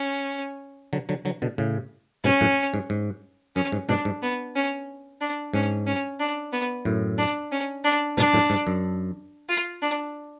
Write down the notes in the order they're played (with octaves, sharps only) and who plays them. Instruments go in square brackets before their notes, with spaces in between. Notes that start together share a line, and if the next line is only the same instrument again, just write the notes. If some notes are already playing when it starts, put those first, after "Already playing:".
Already playing: [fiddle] C#4
[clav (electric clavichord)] D3 F#3
D3 F#3
D3 F#3
B2 D3
A2 C#3
[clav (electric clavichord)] G#2 B2 [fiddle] C#4
[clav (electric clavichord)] F#2 A2
G#2
G#2
[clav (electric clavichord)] F#2 [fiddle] C#4
[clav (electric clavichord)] G#2
[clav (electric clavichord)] G#2 B2 [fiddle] D4
[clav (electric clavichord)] G#2
[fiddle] B3
C#4
D4
[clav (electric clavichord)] G#2 [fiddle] C#4
[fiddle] C#4
D4
B3
[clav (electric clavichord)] F#2 A2
[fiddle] D4
C#4
D4
[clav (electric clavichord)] G#2 B2 [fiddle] D4
[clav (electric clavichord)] F#2 A2
G#2
F#2
[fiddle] F4
D4